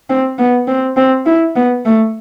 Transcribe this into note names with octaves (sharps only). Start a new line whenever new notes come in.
C4
B3
C4
C4
E4
B3
A3